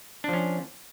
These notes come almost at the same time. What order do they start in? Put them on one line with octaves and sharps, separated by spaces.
D4 F3 C#4